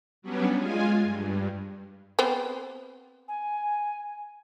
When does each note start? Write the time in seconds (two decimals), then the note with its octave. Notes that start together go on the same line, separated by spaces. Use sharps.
0.22 F#3 G3 B3 C#4 D4
0.57 G#3 F4 G#5
1.02 G2
2.19 B3 C4 C5
3.28 G#5